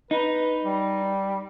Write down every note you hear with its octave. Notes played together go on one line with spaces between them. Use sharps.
D#4 B4
G3